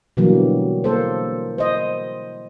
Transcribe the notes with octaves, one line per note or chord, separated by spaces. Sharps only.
B2 D3 E3 F#3 G3 A#3
A#3 A4 C5
C5 D#5